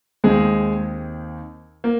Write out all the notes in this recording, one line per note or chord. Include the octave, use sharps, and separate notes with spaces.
D#2 D#3 G#3 C4 G#4
A#3